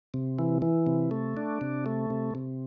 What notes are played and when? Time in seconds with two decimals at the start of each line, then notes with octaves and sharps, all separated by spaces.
0.14 C3
0.39 E3
0.62 E3
0.87 C3
1.11 A3
1.37 D4
1.61 C3
1.86 A3
2.10 C3
2.35 C3